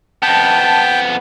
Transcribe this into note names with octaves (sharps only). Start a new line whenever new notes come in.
F2 B3 G5 A5